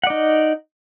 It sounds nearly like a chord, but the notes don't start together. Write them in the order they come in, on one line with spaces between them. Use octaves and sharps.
F#5 D5 D#4